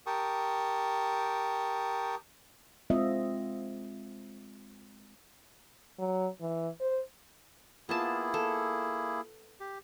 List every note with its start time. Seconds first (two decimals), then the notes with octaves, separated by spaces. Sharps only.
0.07 G4 A#4 G5 A5 C#6 D#6
2.90 G#3 C4 F4 D#5 E5
5.99 F#3
6.41 E3
6.80 C5
7.89 A#3 B3 E4 F4 G#4 A5
8.34 A4
9.60 G4